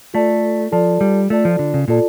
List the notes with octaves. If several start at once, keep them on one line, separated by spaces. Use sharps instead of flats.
A3 F4 A4 D5 A5
F3 F4 A4 D5 A5
G3
A3 F4 A4 D5 A5
F3
D3
C#3
A#2 F4 A4 D5 A5